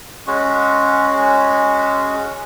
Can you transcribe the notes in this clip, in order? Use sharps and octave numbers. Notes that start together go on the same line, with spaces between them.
G#3 C#4 F#4